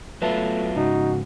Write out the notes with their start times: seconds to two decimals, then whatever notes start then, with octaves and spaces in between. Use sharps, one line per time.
0.22 F#3 A3 B3 F4 B4 E5 A5
0.76 G#2 C#3 D#4 F#4